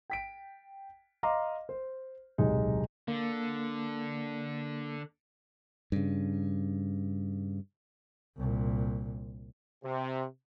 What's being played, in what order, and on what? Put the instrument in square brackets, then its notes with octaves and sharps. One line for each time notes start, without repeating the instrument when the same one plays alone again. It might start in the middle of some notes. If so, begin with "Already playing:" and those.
[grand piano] G5 B6 D7
D#5 F5 A#5 C6 D6
C5
D1 B1 C3 G#3 D#4 G#4
[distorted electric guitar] D3 [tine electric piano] A#3
[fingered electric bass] G2 C#3
[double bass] C2 A#2
[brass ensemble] C3